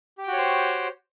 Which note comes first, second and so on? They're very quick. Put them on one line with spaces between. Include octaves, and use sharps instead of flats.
G4 G5 F#4 C#5 C5